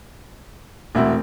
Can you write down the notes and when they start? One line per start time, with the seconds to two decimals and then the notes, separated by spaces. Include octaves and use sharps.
0.95 E1 A3 C4 E4 F#4